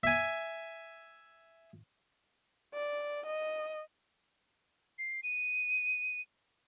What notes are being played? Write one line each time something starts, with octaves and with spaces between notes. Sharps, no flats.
E5 G#5
D5
D#5
C7
D#7